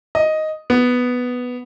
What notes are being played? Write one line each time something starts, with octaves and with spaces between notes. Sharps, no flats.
D#5
B3